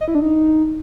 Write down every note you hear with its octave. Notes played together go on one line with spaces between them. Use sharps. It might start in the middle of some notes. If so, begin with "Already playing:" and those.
D#5
E4
D4
D#4